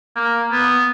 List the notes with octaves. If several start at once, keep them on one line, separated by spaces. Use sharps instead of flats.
A#3
B3